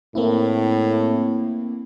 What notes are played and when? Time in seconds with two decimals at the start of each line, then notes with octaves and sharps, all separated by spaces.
0.15 A2 A#3 C4 E4